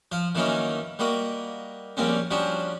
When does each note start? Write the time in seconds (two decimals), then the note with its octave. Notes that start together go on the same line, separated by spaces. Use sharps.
0.12 F3 F5
0.35 D#3 E3 F#3 A#3 C#4 D#4
0.99 G3 A#3 F#4 D#5
1.97 A#1 G3 A#3 C4 C#4
2.31 F3 G3 C#4 D4 F#4